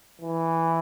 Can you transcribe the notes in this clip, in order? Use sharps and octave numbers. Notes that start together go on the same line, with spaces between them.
E3